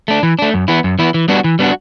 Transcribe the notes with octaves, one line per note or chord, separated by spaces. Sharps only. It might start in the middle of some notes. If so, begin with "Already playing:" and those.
A3 D4
E3
A3 D4
F#2
E3 B3 E4
F#2
E3 B3 E4
E3
G3 B3 D4 F#4
E3
G3 B3 D4 F#4